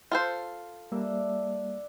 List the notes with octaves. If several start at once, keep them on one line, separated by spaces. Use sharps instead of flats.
F4 A4 C5
G3 A#3 D4 E5